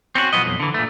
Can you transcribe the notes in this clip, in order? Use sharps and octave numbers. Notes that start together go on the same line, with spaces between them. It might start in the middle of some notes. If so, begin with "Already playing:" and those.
C4 C#4 E4 F#4
B1 F2 F3 B3 D#5
B1 F2
D3 E3
A#2 A3